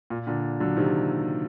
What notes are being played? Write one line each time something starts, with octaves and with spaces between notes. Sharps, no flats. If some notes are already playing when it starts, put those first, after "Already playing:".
A#2
A#2 D3
D3 F#3
C3 D#3